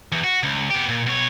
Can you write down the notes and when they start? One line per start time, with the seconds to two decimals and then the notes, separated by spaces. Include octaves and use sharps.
0.12 E2
0.24 F#4
0.43 C#2
0.71 B3 G4
0.89 A#2
1.06 B2 C#5